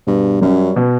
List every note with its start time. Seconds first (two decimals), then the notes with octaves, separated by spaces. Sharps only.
0.07 G2 B2
0.41 F#2 G3 C#4
0.76 B2